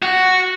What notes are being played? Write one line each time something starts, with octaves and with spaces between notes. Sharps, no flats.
F#4